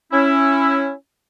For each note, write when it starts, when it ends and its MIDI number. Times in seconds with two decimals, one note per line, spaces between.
0.13 0.90 61
0.13 0.90 64